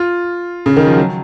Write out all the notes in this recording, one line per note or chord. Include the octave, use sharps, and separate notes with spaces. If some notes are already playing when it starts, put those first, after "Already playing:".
Already playing: F4
C#3
D#3
F3
F#3